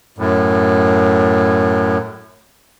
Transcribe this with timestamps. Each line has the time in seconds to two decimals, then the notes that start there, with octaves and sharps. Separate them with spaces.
0.18 F#2 A2